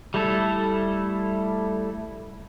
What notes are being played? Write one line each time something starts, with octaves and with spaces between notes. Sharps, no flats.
G3 A3 E4 A4